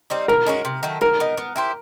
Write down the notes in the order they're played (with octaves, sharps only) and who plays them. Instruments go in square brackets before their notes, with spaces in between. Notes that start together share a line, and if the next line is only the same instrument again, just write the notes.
[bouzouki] G3 C4 D#4
[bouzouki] B2 [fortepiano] A#4
[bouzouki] G#3 C#4 F#4
C3
D#3 F#3 A3
[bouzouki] F#3 [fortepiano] A#4
[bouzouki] B3 D#4
B3
E4 G4 C5